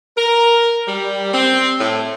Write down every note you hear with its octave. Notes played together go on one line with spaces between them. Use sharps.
A#4
G3
C4
A2